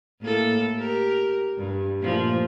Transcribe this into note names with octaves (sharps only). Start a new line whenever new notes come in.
A2 A#3 A4
G4 A#4
G2
A#2 F3 A3